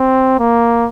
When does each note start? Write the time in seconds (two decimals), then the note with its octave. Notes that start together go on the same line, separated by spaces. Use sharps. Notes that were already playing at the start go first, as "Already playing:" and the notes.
Already playing: C4
0.39 A#3